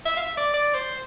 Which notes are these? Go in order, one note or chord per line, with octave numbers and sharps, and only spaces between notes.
E5
F5
E5
D5
D5
C5